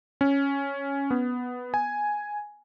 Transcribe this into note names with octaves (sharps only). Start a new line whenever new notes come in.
C#4
B3
G#5